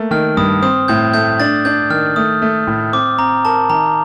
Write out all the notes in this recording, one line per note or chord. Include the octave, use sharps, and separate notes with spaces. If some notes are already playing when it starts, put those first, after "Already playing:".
Already playing: A3 A#3
D#3 F6
G2 D#6
C4 D#6
A2 G6
A3 G6
D4 A6
D4 G6
D#3 F6
A3 D#6
A3
A2
C4 D6
C4 A#5
A#4 A5
D#3 A#5